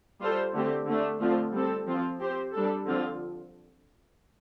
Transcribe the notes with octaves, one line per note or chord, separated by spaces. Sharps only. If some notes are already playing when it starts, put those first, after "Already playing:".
G3 F4 A4 C5
D3 A3 C4 G4
D3 A3 D4
D3 F3 A3 C4 F4
G3 C4 A4
F3 C4 F4
C4 G4 C5
G3 D4 A4
D3 F3 C4 F4